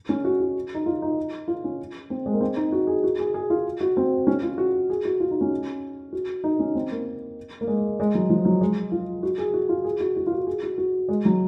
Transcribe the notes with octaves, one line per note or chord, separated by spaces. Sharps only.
C#4
F#4
F#4
D#4
F4
D#4
F4
C#4
C4
G#3
A#3
C4
D#4
F#4
G#4
F#4
G#4
G#4
F4
F#4
C4
C#4
F4
F#4
G#4
F#4
F4
D#4
C#4
F#4
D#4
C#4
C4
A#3
A#3
G#3
G#3
F#3
F3
F#3
G#3
F4
F#4
G#4
F#4
F4
G#4
F#4
F#4
F4
F#4
G#4
F#4
F#4
G#3
F#3